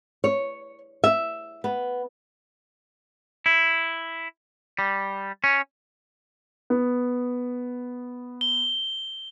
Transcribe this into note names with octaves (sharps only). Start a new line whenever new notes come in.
C#5
E5
B3
E4
G3
C#4
B3
G7